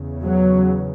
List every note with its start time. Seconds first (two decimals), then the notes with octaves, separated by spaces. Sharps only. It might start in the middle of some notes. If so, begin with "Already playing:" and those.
Already playing: E2 C#3
0.23 F#3